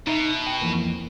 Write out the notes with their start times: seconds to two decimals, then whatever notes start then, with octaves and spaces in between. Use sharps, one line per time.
0.07 B2 D#4 D#5 E5
0.47 G5
0.61 F2 E3 A#3